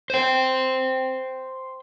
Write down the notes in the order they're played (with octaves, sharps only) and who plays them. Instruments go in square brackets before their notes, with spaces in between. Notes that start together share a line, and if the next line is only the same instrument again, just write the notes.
[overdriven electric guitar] C5 G5